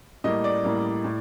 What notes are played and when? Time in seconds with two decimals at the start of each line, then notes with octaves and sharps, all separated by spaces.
0.24 A2 G3 A#3 D#5
0.44 D5
0.64 A2 G3 A#3
1.04 A2